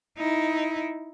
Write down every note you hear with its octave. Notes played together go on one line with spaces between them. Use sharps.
D#4 E4